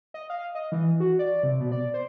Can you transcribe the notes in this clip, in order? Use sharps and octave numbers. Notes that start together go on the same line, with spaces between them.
D#5
F5
D#5
E3
F#4
D5
C3
B2
D5
C5